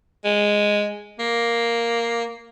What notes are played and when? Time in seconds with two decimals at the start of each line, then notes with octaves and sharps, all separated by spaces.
0.25 G#3
1.19 A#3